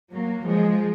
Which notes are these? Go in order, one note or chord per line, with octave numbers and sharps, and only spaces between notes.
F#3 A#3
F3 G#3